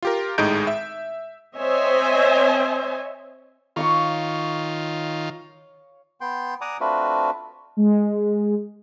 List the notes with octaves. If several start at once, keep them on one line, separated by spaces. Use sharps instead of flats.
F4 G4 A#4
G#1 A2 G#3 D#4 G6 D7
E5
C4 C5 C#5 D#5 E5 G#5
D#3 F4 C#5 F5 C#6
B3 G5 C6
D5 F#5 G#5 A#5 D6 D#6
A3 C4 D4 F4 F#4 B4
G#3